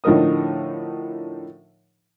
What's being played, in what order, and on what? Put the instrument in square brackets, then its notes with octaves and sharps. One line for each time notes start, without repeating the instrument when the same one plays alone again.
[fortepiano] A2 D3 F3 D#4 A#4 D#6